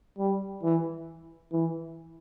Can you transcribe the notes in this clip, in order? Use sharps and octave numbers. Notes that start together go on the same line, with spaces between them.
G3
E3
E3